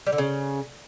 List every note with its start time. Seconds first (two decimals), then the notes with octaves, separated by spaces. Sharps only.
0.06 G3
0.12 D3
0.18 C#3